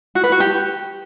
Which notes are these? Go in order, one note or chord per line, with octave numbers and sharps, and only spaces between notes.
F#4
B4
F#4
G4